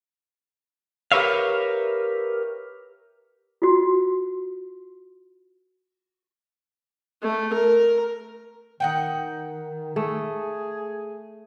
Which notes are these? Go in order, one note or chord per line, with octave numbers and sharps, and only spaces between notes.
G4 A#4 B4 C#5 E5 F5
F4 F#4
A3
A#4
D#3 D#4 F#5 G5
A3 G#4